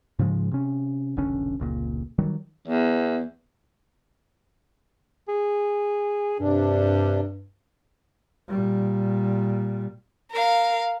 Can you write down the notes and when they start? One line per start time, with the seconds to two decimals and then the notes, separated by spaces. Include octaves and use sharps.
0.19 G#2 C#3 F3 G#3
0.51 C3 C#4
1.17 F1 B1 D3 C#4
1.60 F1 C#2 A#2
2.19 D#3 F#3 G3
2.67 E2 B3
5.28 G#4
6.40 G2 C3 D4
8.48 A#2 G3
10.31 A#4 F5